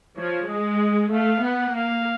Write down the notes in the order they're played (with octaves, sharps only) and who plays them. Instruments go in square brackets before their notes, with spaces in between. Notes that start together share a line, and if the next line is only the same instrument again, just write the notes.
[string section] F3 [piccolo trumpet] C#5
[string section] G#3 [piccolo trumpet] D#5
[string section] A3 [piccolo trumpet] F5
[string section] B3 [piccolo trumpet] F#5
[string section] A#3 [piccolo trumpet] F5